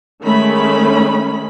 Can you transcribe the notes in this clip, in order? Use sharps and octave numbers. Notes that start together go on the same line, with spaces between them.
D#3 G#3 A3 C#4 B5